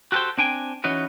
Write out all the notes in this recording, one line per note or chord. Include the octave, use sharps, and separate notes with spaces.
F#4 G4 A4 B4 C5 G5
C4 D4 G5 G#5
E3 C#4 D#4 F#4 B4